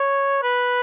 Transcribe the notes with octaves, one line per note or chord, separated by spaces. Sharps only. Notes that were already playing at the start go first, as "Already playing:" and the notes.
Already playing: C#5
B4